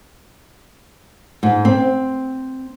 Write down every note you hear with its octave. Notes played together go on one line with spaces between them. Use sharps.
G#2
C4